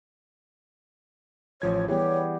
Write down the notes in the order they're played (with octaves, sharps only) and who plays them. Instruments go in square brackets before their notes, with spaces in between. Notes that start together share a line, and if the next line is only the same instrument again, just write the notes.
[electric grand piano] A1 F3 G#6 [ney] C#5
[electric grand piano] E3 G#4 [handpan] G3 B3 G4 [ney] C#5